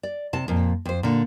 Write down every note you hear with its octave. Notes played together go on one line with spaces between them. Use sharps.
D5
C3 A5
F2 A#2
F2 C5
A#2 D3